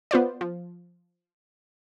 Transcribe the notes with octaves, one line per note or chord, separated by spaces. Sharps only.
B3 F4 C5 D5
F3